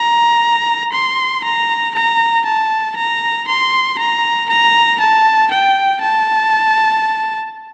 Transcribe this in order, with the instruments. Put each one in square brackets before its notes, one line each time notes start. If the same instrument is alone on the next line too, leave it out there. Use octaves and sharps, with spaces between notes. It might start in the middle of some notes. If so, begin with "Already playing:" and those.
Already playing: [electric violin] A#5
C6
A#5
A#5
A5
A#5
C6
A#5
A#5
A5
G5
A5